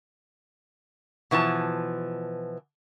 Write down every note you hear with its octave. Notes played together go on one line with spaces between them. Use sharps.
B2 E3 F3 A5